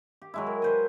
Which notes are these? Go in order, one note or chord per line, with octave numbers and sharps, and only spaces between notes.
G4
F#3 G#3 E4
A#4
B4 C5 G#5